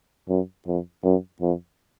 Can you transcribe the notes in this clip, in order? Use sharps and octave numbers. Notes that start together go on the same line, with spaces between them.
F#2
F2
F#2
F2